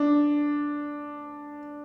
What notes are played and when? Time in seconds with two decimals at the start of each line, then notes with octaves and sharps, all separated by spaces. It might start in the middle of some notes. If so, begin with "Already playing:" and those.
Already playing: D4